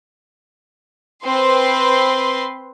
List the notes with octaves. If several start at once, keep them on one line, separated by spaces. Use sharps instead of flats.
C4 B4 C6